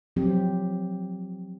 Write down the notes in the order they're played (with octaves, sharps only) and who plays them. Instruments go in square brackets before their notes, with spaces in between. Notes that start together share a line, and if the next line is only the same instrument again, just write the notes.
[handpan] F3 F#3 C4 G4